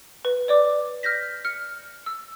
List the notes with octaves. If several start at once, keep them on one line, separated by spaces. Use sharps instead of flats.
B4
C#5 D5 D6
F6 G6 A#6 B6
F6 C#7
E6